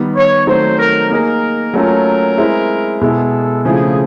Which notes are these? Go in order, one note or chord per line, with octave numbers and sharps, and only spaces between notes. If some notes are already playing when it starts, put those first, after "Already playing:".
Already playing: D#3 G3 B3
C#5
D#3 F#3 A3 C4 C5
A#4
A#3 D#4 G#4 A#4
F#3 A3 C#4 F4 A4 A#4
G#3 C4 E4
B2 G#3 B3 E4 A4
C#3 F3 A3 C4 E4 G#4